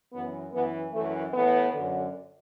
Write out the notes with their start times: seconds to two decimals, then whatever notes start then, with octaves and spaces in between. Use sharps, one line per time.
0.12 F#2 E3 B3
0.53 F#2 E3 B3
0.92 F#2 E3 A3
1.33 A2 E3 B3
1.72 F#2 D3